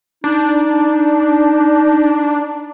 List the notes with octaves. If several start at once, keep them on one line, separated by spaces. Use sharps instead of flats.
D4 D#4